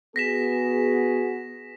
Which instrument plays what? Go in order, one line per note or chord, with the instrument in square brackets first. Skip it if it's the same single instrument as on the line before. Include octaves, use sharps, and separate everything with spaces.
[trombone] B3 [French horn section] F#4 G#4 [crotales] A#6 B6 E7